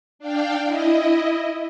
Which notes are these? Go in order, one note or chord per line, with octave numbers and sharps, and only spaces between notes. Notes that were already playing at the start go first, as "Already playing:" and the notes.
D4 F5 G5
E4 D#5